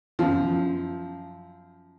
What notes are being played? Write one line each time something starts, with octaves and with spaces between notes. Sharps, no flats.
F#2 F3